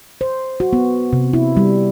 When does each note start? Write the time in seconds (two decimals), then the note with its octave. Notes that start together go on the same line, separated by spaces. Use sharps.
0.21 C5
0.60 F#4
0.73 B3
1.13 C3
1.33 E4
1.57 G3